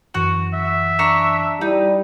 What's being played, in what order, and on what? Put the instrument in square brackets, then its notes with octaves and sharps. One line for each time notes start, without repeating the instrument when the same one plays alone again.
[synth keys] F#2 E3 F#6 [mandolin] F#4
[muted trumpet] E5
[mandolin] D4 A#5 C#6
[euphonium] G3 [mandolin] D#4 [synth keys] E4 D#7